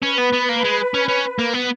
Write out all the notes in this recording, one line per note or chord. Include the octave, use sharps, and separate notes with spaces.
C#4 B4
B3
B3
A#3
G#3
C#4
C#4
A#3
B3